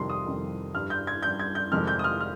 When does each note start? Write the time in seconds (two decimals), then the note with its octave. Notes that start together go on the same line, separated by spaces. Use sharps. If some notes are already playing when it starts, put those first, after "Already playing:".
Already playing: F2 C3 D#3 G3 C6
0.09 D#6
0.25 F2 C3 D#3 G3
0.74 G2 G3 F6
0.90 G6
1.07 G#6
1.22 G2 G3 G6
1.39 G#6
1.55 G6
1.72 F2 C3 D#3 G#3 F6
1.87 G6
1.99 D#6
2.04 F6
2.20 F6